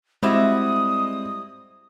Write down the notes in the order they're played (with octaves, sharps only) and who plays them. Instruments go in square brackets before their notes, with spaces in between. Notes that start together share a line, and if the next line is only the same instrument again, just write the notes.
[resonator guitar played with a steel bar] G3 E4 F#4 [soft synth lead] G#3 [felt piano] C4 [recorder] D#6